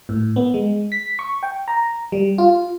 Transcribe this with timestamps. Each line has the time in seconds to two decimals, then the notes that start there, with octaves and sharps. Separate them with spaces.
0.09 A2
0.36 B3
0.54 G#3
0.92 B6
1.19 C#6
1.43 G5
1.68 A#5
2.12 G3
2.38 F4